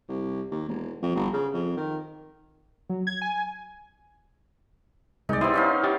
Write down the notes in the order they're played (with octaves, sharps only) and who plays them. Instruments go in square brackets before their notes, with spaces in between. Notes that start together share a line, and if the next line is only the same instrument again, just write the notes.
[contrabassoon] C2
D#2
E1
F2
G1
C#3
F2
D#3
[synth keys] F#3
G#6
G#5
[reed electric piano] C2 G#3 [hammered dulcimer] D#4 D5
[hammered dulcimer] G3 B3 C4 [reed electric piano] E4 C6 D#6
[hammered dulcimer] C#4 D#4 F5
[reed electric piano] E4 G4 A6